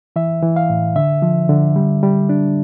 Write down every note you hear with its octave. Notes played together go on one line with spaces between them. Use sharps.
E3 E5
E3
F5
A2
D3 E5
F3
D3
G3
G3
D4